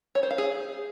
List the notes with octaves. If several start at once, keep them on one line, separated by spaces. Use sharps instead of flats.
C#5
C5
F5
G#4